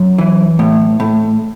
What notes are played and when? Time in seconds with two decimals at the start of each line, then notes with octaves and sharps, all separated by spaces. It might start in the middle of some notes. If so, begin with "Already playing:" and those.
Already playing: F#2
0.18 E3
0.59 A2
1.00 A2